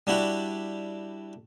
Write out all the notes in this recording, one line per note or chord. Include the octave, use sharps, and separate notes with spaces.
G3 D4 E4 F#4 G4